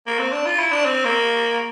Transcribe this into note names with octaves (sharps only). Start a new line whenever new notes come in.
A#3
C4
D4
F4
E4
D4
C4
A#3